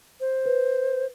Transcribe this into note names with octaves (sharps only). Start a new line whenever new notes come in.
C5
B4